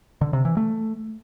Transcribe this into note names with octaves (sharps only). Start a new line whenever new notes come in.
D3
C3
E3
A3